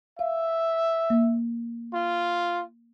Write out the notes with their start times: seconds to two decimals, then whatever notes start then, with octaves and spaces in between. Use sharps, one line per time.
0.19 E5 F5
1.10 A#3
1.94 F4